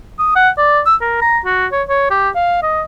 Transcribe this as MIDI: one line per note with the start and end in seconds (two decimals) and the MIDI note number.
0.19 0.33 87
0.35 0.50 78
0.58 0.81 74
0.86 0.95 88
1.01 1.21 70
1.22 1.39 82
1.45 1.66 66
1.72 1.83 73
1.89 2.07 73
2.10 2.30 67
2.35 2.60 77
2.63 2.83 75